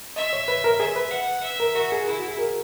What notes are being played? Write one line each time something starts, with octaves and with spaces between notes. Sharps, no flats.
D#5 E5
C#5
B4
A#4
G#4 E5
B4
F#5
E5
A#4
F#4 A#4
G#4
E4 G#4
F#4
G#4
A#4